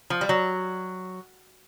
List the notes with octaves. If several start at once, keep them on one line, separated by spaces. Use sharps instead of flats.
F3
G3
F#3